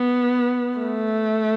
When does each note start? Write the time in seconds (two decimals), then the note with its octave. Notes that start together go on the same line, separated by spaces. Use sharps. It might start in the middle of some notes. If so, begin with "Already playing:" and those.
Already playing: B3
0.78 A3